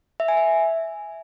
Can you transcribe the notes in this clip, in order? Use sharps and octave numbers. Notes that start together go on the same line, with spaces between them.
E5
G#5
E5